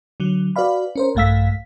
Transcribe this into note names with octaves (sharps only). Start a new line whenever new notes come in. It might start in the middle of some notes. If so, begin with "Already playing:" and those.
D3 F#3
F#4 B4 D5 F5 B5
C#4 A#4 C5
A#1 G2 A3 F5 E6 B6